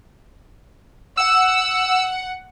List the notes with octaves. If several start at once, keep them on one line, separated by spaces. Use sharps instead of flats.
F#5 E6